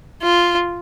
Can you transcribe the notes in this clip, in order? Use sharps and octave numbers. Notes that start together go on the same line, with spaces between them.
F4